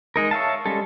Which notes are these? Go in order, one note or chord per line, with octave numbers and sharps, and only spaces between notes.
G#3 D#4 A#4
C#5 E5 F5 A5
G3 G#3 C#4 A4